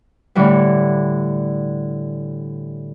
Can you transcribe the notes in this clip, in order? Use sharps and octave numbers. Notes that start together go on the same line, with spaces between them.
A2 D3 E3 G3